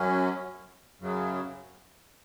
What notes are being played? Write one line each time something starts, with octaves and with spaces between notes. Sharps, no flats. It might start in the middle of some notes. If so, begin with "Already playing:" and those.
Already playing: F#2 F#3 C#4
F#2 C#3 F#3